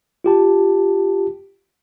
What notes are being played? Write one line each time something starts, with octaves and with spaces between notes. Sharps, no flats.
F4 G4 A5